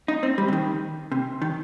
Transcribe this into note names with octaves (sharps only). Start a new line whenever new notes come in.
D#4
C4
G3
C3
D#3
C3
D#3